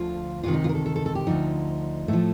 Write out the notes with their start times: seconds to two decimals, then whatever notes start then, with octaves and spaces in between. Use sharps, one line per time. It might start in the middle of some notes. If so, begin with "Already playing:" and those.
Already playing: D2 D3 F3 F4
0.43 D2 C3 D#3 F4
0.54 D#4
0.64 F4
0.69 A#4
0.75 A4
0.86 A4
0.96 A4
1.06 A4
1.15 G4
1.27 D2 D3 F3 D#4
2.08 A2 F3 A3